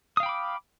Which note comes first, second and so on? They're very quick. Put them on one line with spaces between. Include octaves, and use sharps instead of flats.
D#6 F5 G5 B5 D6